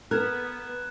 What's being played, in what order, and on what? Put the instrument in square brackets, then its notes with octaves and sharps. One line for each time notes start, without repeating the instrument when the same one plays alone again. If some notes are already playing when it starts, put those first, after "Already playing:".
[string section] B3 [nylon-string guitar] A#4 [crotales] F#6 G#6 E7